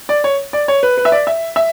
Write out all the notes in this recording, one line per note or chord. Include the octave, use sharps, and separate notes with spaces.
D5
C#5
D5
C#5
B4
B4
E5
D5
E5
E5